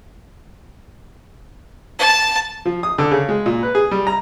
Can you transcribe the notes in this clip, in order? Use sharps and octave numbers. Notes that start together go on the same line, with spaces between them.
A5
F3
D#6
D3
C#3
G#3
A#2
B4
G#4
G3
A#5